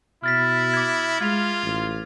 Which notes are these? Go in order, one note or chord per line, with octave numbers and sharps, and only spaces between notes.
B2 E4 F6 A6 B6
D6 G#6
G#3 F4 G#6 F7
A1